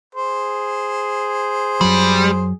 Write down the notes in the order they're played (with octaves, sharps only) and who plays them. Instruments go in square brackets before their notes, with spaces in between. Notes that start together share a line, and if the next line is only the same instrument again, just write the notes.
[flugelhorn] G#4 [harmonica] C5
[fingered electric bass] F#2 F#3 [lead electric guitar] G3